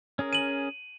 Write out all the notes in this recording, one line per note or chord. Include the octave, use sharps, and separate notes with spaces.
C#4 G#4 A#4
D#7 F#7